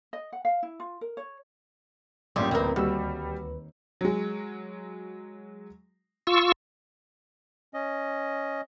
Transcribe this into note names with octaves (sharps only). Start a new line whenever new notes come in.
D#5
F#5
F5
E4
F4
A#4
C#5
A1 F#2 A#2 G3 C6
D2 C4 A#4 B4
D#2 G3 F#4 E6
F#3 G#3
F4 C#6 E6
C#4 D#5